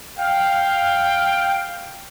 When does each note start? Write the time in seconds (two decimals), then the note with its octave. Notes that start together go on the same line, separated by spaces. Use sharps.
0.19 F5 G5